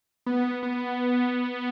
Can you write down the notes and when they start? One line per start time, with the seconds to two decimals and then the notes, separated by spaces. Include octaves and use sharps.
0.26 B3
0.63 B3